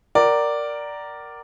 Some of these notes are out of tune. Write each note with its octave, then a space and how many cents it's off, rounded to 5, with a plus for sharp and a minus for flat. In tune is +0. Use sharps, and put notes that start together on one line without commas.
A#4 +0 D5 +0 F#5 +40